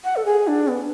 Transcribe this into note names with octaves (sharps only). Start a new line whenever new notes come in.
F#5
A4
G#4
D4
B3